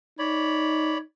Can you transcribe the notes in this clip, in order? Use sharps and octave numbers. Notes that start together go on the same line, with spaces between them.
D#4 C#5 D5 B5